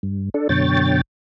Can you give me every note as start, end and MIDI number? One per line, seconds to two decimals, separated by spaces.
0.03 0.29 43
0.34 0.48 62
0.34 0.48 69
0.49 1.01 42
0.49 1.01 47
0.49 1.01 50
0.49 1.01 73
0.49 1.01 79
0.49 1.01 93